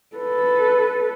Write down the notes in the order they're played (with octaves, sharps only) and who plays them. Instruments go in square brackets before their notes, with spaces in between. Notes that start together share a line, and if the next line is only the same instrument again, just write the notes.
[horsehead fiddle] A4 B4